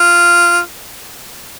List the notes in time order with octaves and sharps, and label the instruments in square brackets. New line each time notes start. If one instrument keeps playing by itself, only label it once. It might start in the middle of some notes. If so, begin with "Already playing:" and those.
Already playing: [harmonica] F4